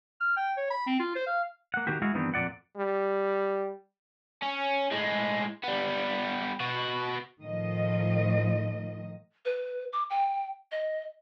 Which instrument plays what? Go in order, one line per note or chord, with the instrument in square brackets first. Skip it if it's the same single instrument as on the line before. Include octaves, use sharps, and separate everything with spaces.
[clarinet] F6
G5
C#5
B5
C4
F4
C5
F5
[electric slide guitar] A#3 F#5
D#3 A#3 F#4 G4
G#3 E4 F#4 G#4 F5
G2 D#3 E3 B3 C4 D4
F2 A#2 D5 F#5
[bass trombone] G3
[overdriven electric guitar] C#4
A2 G#3
G3 B3
B2 F#4
[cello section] A2 D#3 F3 D#5
[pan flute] B4
D6
G5
D#5